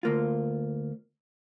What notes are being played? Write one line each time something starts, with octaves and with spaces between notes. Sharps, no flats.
D2 A#3 F4